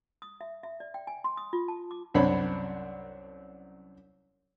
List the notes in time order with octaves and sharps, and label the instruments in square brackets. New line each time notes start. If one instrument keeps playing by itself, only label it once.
[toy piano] D#6
E5
E5
D5
G5
G#5
C6
D#6
F4
A5
D6
[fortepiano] C2 F#2 C4 D4 C#5 B5